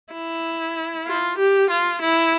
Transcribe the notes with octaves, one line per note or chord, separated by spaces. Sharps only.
E4
F4
G4
F4
E4